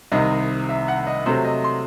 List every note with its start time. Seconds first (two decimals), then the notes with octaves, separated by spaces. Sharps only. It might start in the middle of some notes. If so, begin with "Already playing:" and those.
0.12 C2 C3 D#3 D#5
0.69 E5
0.88 F#5
1.07 D#5
1.26 C3 F#3 A3 C4 C5
1.45 D#5
1.64 C6